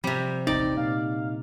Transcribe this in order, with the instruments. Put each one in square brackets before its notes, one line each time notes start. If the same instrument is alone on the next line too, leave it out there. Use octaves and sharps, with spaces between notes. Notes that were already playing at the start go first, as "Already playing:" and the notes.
[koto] C3 G3 [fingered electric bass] F3 [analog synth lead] C4
[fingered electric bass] D#1 A1 [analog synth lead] C4 [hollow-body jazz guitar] D#4 [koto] D5
[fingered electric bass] A#2 [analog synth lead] F5